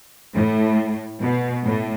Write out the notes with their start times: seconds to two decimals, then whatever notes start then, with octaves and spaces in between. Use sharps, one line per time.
0.36 A2
1.22 B2
1.65 A2